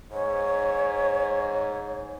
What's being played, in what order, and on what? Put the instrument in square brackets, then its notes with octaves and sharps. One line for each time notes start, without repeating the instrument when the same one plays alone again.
[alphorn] G#2 [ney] C#5